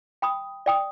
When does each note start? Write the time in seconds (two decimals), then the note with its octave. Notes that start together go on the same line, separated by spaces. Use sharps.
0.22 G5 B5 D#6
0.66 D5 G5 D#6